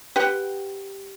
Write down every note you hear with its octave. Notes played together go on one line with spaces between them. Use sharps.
G4 B4 F#5 G5